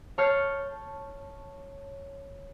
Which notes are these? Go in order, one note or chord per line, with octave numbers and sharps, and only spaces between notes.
C#5 A5 F6 G6 C7 C#7